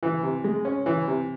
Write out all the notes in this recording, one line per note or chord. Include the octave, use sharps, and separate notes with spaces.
E3
C3
G#3
C#4
E3
C3